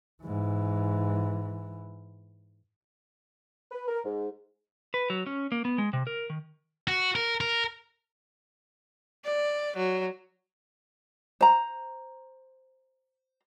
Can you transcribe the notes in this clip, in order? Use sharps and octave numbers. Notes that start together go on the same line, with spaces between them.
G#2 E3
B4
A#4
G#2
B4
F#3
C#4
A#3
B3
G#3
C3
A#4
D#3
F#4
A#4
A#4
D5
F#3
C5 A#5